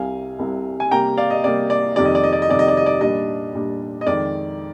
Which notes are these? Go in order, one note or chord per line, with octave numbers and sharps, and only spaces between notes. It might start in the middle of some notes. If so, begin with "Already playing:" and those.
Already playing: C2 C3 G3 F5 G#5
C2 C3 G3
G#5
C3 G3 A#3 G5 A#5
D5 F5
D#5
C3 G3 A#3 D5
D5
F2 C3 D#3 G3 D5
D#5
D5
D#5
D5
D#5
F2 C3 D#3 G3 D5
D#5
D5
D#5
D5
A#2 G3 D4 D#5
A#2 G3 D4
D#5
F2 D#3 G#3 D5